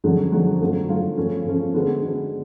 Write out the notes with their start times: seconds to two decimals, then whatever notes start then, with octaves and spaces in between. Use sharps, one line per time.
0.04 F2 D3 F#3 C#4 G#4
0.32 F2 D3 F#3 C#4 G#4
0.61 D3 F#3 A3 F4
0.89 D3 F#3 A3 F4
1.17 C#3 F3 A3 C#4
1.45 C#3 F3 A3 C#4
1.74 D3 G#3 B3 F#4
2.02 D3 G#3 B3 F#4